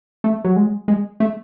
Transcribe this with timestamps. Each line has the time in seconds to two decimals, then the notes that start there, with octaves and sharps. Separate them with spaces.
0.24 A3
0.45 F#3
0.56 G#3
0.88 G#3
1.20 A3